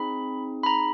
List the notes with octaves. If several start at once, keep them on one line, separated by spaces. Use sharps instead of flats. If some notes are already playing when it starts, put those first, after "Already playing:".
Already playing: C4 D#4 G#4 B5
B5
A#5